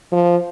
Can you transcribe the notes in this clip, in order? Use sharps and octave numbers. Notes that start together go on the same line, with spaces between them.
F3